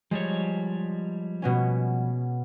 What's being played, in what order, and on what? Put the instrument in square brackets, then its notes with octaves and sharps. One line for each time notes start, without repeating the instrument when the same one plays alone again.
[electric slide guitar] F3 G3 C#5 [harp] G#3
[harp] B2 B3 C#4